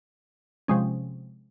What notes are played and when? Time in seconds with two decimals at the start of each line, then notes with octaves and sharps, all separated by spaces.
0.68 C3 F3 G#3 C#4